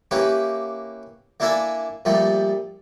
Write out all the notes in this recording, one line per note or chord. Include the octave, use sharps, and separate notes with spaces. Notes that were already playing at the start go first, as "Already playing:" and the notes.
A#3 C#4 E4 G4 B4
A#3 D4 E4 A4 E5 G#5
A#2 F3 G3 A3